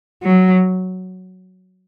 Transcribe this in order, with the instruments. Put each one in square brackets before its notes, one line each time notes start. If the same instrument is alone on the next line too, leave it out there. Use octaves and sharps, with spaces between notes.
[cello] F#3